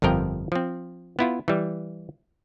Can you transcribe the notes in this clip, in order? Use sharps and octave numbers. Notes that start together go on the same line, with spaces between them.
G1 F2 F3 A#4 G5
F3 C4
B3 E4 F4
E3 G3